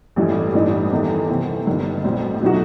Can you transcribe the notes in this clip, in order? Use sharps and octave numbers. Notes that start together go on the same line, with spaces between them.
A1 G2 E3 A3
A1 G2 E3 G3 D#4
E2 D#3 A3
E2 C3 E3 A3 C4
G1 G2 D#3
B1 A2 G3 C4
B2 F#3 A3 D#4 F#4